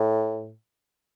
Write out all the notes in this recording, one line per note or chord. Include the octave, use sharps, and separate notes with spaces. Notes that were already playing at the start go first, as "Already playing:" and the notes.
Already playing: A2